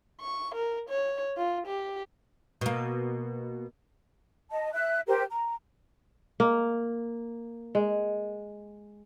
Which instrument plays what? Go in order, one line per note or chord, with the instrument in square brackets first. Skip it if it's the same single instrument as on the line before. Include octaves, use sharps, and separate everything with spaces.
[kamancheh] C#6
A#4
C#5
F4
G4
[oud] B2 A#3
[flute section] D#5 A5
E5 F#6
G4 A#4 C5
A#5
[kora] A#3
G#3